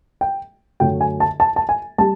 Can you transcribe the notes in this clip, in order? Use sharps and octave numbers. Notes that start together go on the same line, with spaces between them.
G5
F#2 D3 F#3 A3 G5
G#5
A5
A5
A5
G#5
G3 A5